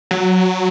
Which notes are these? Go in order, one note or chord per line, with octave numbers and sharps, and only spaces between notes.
F#3